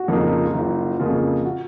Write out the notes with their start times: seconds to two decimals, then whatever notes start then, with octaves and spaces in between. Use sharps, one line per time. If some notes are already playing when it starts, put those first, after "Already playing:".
Already playing: F#4
0.08 F2 C#3 F3 A#3 D#4
0.24 F4
0.46 F4
0.54 F#1 D#4
1.00 F2 C#3 F3 A#3 F4
1.45 F#4